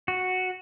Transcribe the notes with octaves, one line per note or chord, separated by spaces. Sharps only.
F#4